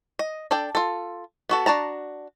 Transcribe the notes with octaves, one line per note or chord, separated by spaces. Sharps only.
D#5
D4 A4 D5 G5
F4 A4
B3 F#4 A4
D4 F#4 A5 A#5